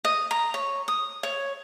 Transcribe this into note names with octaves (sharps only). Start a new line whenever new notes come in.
D#5
A#5
C#5
D#6
C#5